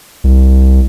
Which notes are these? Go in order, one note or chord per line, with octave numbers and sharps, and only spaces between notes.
C2